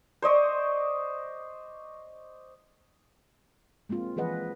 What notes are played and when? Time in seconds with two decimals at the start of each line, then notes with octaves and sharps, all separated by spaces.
0.22 C5 D5 D#5 C#6
3.89 G#3 A#3 C4 F4
4.16 E3 F3 G#4 B4 D#5 F#5